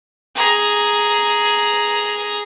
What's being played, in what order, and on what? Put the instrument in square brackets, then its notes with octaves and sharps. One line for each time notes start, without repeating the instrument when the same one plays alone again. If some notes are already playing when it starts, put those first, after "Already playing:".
[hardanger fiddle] G#4 A#5